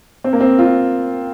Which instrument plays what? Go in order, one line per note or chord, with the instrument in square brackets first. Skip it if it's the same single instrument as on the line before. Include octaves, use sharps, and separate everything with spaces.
[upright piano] C4
A#3
C4
F4